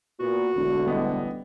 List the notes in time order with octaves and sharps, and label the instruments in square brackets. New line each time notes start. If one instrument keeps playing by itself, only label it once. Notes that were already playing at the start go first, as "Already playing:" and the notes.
[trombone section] A#2 B3 [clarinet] F#4
[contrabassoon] E1 [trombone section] A1 D3
[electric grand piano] G3 B3 D#5